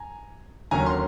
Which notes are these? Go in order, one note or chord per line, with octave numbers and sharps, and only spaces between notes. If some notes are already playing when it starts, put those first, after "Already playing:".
Already playing: G#5 A#5
D#2 D3 F#3 A#3 C#4 G#5 A#5
A#5 C6